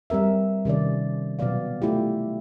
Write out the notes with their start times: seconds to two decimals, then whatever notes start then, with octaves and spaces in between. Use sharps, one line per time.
0.10 G3 C4 A#4 E5
0.65 C3 D#3 C#4 D5
1.39 B2 F#3 B3 D5 F5
1.82 A3 E4 F4 G4